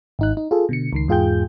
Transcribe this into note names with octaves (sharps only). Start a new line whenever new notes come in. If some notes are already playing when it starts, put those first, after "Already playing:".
G#1 D#4 F#6
D#4
F4 G#4 A4
B2 D3 C#7
C#2 D#3 C7
E2 G#2 F4 G#4 G5 G6